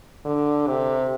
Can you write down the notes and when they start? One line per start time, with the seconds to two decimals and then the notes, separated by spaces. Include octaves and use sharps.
0.25 D3
0.67 C3